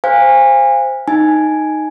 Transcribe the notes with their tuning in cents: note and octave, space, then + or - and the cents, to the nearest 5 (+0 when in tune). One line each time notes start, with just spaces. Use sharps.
C5 +0 F5 +0 G#5 -30
D#4 +0 G#5 +0